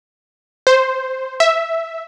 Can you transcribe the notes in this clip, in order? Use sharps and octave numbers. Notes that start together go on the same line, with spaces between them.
C5
E5